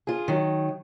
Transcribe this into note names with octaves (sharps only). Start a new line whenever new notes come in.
F4 G#4
D#3 F#3